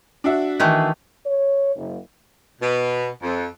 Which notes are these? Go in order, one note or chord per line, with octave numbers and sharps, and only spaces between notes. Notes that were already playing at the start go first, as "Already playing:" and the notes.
D4 F#4 E5
D#3 E3 A3
C#5
F#1
B2
F2